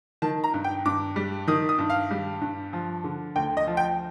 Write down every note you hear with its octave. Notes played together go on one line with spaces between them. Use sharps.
D#3 A5
A#5
G2
G5
G2 D6
G3
D#3 D#6
D#6
G2
F5
G3
G2
F3
D3
D2 G5
D#5
F3
G5